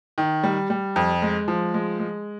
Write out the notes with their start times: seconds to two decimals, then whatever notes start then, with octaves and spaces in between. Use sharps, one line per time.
0.18 D#3
0.44 G3
0.70 G3
0.96 F2
1.22 G#3
1.48 F3
1.74 G#3
2.00 G#3